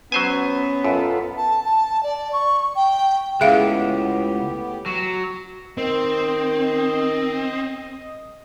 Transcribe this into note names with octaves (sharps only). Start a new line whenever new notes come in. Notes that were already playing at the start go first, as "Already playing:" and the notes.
F#3 B3 C#4 C5 G#5
F#2 F4 A4 B4
A5
A5
D5
C#6
G5
C#2 A2 B3 G4 G#4 E5 F5
F#3
D#3 C4 D#5